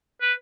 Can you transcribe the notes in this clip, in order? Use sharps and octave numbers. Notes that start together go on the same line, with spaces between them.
B4